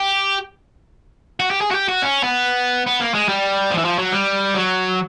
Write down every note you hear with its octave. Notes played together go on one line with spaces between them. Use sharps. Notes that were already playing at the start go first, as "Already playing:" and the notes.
Already playing: G4
F#4
G4
G#4
F#4
G4
F#4
C#4
B3
B3
A#3
G#3
G3
F3
E3
F3
F#3
G3
F#3